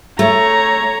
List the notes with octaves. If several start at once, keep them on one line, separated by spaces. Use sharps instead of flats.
A3 C#5 A#5